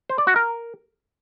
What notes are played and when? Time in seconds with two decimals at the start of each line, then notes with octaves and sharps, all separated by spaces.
0.10 C5
0.18 D5
0.27 F#4
0.36 A#4